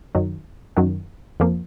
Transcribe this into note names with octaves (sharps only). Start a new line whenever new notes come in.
F#2 D#3 F#3
F#2 D#3 F#3
F2 F3 A#3